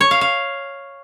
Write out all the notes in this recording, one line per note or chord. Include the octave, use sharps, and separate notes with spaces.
C#5
F5
F5